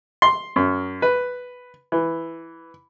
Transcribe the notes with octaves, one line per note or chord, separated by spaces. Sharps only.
C6
F#2
B4
E3